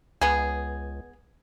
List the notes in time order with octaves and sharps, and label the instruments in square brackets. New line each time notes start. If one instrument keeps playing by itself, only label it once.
[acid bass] C#2 [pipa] B3 G#4